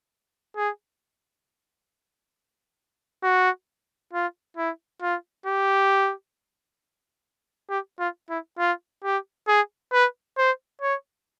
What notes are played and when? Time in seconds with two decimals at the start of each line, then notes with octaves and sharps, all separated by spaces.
0.56 G#4
3.23 F#4
4.13 F4
4.57 E4
5.02 F4
5.46 G4
7.70 G4
7.99 F4
8.30 E4
8.59 F4
9.04 G4
9.48 G#4
9.92 B4
10.38 C5
10.81 C#5